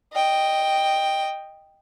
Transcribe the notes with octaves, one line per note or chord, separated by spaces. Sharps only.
D#5 G5